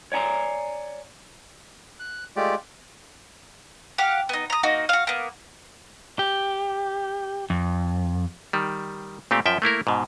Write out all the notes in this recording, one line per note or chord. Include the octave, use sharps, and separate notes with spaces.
C#5 D5 G#5 A#5
F#6
G#3 A3 F4 G4 D5
G4 F5 F#5
B3 D#4
A#5 D#6
A#3 D#4 F#4
F#4 F5
A#3 B3
G4
F2
D#3 G3
A#2 A3 C4 G4
F#2 F3 E5 G5
A3 A#3 E4 A#4
G#2 B2